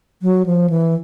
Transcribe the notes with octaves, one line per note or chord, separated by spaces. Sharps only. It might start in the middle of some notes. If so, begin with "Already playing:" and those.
F#3
F3
E3